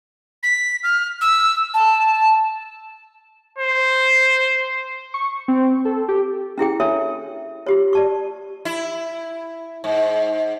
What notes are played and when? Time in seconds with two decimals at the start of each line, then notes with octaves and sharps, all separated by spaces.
0.43 B6
0.83 F6
1.21 E6
1.74 A5
3.59 C5
5.14 C#6
5.48 C4
5.85 A4
6.08 G4
6.58 C#4 E4 G#4 G5
6.80 D4 A4 C#5 E5
7.67 F4 G4 C#5
7.93 D5 A5 C#6
8.65 E4
9.84 G#2